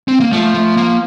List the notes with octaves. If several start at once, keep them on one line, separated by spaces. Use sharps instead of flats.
C4
A#3
F3 A3
A3
A#3